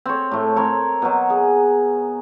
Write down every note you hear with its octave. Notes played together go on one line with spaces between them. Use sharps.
C4 C#5
A2 A3
C4 A#4 C#5
B2 F#3
G#4